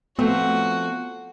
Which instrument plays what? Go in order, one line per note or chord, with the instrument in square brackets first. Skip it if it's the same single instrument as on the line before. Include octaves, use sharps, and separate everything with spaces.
[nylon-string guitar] F3 A3 C4 [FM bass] B3 [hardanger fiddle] F#4